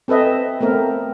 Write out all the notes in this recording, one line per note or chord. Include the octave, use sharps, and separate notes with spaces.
C4 A4 B4 D#5 E5
A3 B3 C4 A#4